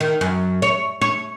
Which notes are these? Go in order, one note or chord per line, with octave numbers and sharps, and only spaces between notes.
D#3
F#2
C#5
C#5